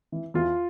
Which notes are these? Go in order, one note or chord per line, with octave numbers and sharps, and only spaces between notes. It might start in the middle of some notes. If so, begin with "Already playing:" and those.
E3
E2 F4